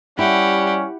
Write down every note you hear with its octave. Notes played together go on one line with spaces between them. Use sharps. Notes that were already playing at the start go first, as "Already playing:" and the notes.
G3 C#4 E4 G4 F#5